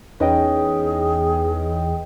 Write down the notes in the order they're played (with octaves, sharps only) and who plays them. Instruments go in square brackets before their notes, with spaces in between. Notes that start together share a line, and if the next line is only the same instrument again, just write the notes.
[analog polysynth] E2 [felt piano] C#4 D#4 [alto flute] G#4 [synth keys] B4 D#5 G5